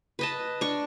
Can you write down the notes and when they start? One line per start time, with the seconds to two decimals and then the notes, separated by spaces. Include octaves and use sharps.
0.19 B4 D#5 A5
0.61 D4 C#6